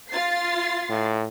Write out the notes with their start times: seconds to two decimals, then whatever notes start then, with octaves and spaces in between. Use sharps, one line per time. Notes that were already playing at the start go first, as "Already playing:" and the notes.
0.10 F4 A6 C7
0.89 A2